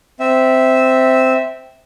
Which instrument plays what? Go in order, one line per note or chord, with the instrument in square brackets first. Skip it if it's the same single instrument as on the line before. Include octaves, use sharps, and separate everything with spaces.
[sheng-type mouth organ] C4 E5